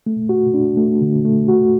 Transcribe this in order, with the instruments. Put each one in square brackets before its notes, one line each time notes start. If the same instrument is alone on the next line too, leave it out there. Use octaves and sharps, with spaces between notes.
[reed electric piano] A3
F#4
D4
A3
D3
A3
F#4